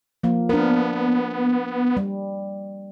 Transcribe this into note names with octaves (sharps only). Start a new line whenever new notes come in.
F3 A#3
B3 D4 A#4
G3